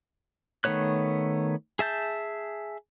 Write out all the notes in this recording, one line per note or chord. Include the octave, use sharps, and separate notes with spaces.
D#3 A3 B3 C#5 F#6
G#4 E5 A5 G6